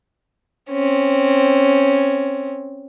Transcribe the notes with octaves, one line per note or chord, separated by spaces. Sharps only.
C4 C#4